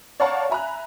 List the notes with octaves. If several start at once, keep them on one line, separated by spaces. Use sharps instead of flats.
C#5 D5 F5 F#5 A5 A#5
E5 G#5 A#5 B5 F#6